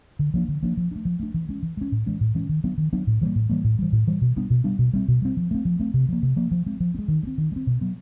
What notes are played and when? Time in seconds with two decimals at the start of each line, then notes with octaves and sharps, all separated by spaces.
0.19 D3
0.34 F3 A#3 D4
0.48 D3
0.63 F3 A#3 D4
0.77 F3
0.91 A3 D4
1.05 F3
1.20 A3 D4
1.34 E3
1.49 G#3 C#4
1.63 E3
1.77 G#3 C#4
1.92 A2
2.06 E3 G#3 C#4
2.21 A2
2.35 E3 G#3 C#4
2.49 D#3
2.64 F#3 B3 D4
2.78 D#3
2.93 F#3 B3 D4
3.07 A2
3.21 E3 G3 A#3
3.36 A2
3.49 E3 G3 A#3
3.64 A2
3.79 E3 G3
3.92 A2
4.07 E3 G3
4.22 B2
4.36 G3 B3 D4
4.50 B2
4.64 G3 B3 D4
4.79 B2
4.93 G3 C4
5.08 B2
5.22 G3 C4
5.37 F3
5.51 A3 C4
5.65 F3
5.79 A3 C4
5.94 C3
6.08 F3 A#3
6.23 C3
6.36 F3 A#3
6.51 F3
6.66 G#3 C4
6.80 F3
6.94 C4
6.98 G#3
7.08 D#3
7.23 G#3
7.27 C4
7.38 D#3
7.52 G#3
7.56 C4
7.67 B2
7.81 F#3 B3